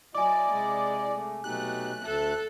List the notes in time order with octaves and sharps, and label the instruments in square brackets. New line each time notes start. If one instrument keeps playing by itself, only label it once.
[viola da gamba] F#3 [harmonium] E4 D#5 [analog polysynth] D5 [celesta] G#5 D6
[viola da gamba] C3 G#3
[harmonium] A3
[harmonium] B2 D#4 G4 [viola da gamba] F#3 A3 [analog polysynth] F#6
[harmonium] D2 E5 A5 [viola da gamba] A4